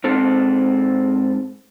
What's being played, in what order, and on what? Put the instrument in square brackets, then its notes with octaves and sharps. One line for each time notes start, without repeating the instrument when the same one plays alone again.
[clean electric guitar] G#2 C4 A4